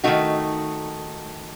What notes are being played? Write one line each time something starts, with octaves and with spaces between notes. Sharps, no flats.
D#3 A3 D#4 F#4